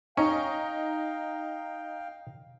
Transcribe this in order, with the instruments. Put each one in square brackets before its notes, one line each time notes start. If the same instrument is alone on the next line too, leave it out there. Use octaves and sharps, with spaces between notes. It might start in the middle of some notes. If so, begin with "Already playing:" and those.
[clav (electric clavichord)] C#4 [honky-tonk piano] D#4 [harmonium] F5 G5